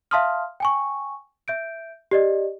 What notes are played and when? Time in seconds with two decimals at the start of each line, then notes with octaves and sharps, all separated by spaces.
0.11 E5 F5 A5 C6 D#6 F6
0.60 G5 G#5 C#6
1.48 E5 G6 D7
2.11 G4 D5 D#5